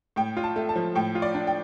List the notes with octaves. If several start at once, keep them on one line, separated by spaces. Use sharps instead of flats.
A2 G5
F4
A5
A3
A5
F3
A2 G5
F4
D5
D4
G5